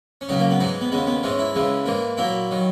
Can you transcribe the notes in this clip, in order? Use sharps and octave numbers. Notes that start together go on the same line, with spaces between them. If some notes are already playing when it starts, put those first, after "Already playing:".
C#4
C#2 C#3 F#3 D#4
A#3
B3
G#2 E3 G#3 D#4
B3
D#2 C#3 G#3 B3
B3
G#2 E3 G#3 C#4
E4
C#2 C#3 E3 G#3
G#2 E3 A#3
A#2 F#3 A#3 E4
D#3 F#3